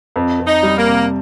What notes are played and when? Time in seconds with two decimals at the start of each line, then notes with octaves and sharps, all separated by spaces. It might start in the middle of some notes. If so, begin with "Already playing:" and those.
0.16 F2
0.40 F2
0.47 D#4
0.63 G3
0.78 A#3
0.85 C3